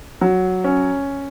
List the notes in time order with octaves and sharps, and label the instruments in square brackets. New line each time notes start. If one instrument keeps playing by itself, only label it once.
[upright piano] F#3
C#4